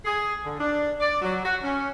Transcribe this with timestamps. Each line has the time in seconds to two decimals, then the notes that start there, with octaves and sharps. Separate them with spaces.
0.05 G#4
0.44 D3
0.59 D4
1.00 D5
1.21 F#3
1.44 F#4
1.62 C#4